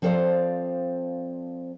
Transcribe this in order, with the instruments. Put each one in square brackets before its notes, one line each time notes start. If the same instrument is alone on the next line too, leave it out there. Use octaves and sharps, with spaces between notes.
[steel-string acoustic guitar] F3 C4 A4 C5 D5 F5